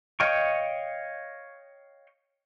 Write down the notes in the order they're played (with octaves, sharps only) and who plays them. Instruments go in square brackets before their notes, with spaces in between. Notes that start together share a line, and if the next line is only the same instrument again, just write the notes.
[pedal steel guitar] C#5 D#5 F5 G5 C#6